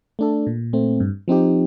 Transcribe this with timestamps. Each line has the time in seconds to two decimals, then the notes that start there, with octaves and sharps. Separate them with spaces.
0.19 A3 D4 A4
0.47 A#2
0.73 A3 C4
1.00 G2
1.28 F3 C4 D#4 G4